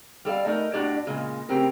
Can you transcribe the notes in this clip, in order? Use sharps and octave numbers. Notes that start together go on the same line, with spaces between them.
G3 A4 D5 F5
A3 D#4 A#4
A2 D4 F#4 G4 D5
A#2 C#3 G#3
C#3 A3 C4 G4 A#4